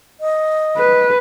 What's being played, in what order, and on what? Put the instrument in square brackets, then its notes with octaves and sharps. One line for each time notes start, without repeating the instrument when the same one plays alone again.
[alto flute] D#5
[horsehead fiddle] B4